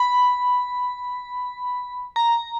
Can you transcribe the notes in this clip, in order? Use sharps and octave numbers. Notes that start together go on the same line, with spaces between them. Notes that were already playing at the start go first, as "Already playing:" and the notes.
Already playing: B5
A#5